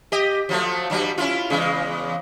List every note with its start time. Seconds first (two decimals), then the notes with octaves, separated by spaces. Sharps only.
0.12 G4 D#5
0.49 F3 F#3 A3
0.90 G2 F#3 G3
1.18 C#4 E4 F4
1.50 E2 C#3 G#3